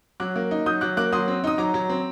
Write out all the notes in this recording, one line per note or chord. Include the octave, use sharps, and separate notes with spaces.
F#3 D6 F#6
A#3
D#4
F#3 D#6 G6
F#3 D6 F#6
A#3 D6 F#6
F#3 C6 D#6
C4
D#4 D#6
F#3 A#5 D6
F#3
C4